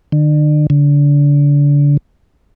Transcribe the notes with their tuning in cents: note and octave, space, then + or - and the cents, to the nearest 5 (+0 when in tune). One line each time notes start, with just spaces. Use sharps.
D3 +40
D3 -30